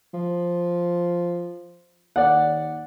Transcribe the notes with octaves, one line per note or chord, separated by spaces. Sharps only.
F3
D#2 D5 F#5